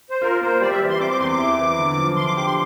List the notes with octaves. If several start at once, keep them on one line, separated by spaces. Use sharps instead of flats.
C5
F4 A#4
A#3 C5
G3 D5
E5
E3
C6
C4 D6
D6
E2 C6
D6
E4
E3
D3
F3
D3 C6
D6
G4 D6
C6